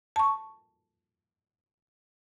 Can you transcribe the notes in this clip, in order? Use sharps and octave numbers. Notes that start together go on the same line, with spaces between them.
A5 C#6